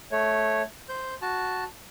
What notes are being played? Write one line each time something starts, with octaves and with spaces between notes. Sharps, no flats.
A3 C#5
C5 G6
F#4 A5